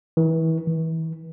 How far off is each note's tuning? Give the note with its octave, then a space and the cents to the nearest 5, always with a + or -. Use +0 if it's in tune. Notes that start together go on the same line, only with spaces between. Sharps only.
E3 -30
E3 -35